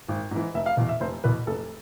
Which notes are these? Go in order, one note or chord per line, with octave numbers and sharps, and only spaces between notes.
G#1
G#2 E3
F1 E5
F5
E2 B2
E5
F1 C5
E2 B2 B4
F1 A4